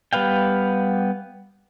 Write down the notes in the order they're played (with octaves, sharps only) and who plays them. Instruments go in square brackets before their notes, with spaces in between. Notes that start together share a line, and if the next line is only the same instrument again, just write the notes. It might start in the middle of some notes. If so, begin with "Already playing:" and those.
[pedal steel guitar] G3 B3 B4 F5 G5